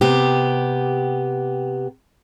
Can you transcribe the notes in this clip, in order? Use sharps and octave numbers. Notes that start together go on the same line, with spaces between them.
C3 B3 G4